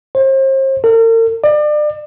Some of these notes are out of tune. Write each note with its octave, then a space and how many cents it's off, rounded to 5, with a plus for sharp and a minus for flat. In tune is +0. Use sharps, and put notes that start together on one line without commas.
C5 +40
A#4 -45
D5 +35